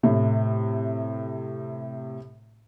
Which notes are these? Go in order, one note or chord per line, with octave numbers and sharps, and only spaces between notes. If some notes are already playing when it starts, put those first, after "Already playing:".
A2 C3